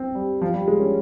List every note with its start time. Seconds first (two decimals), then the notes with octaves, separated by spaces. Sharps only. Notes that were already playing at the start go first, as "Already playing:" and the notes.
Already playing: C4
0.15 G3
0.42 F3
0.54 G3
0.68 G#3
0.80 C#4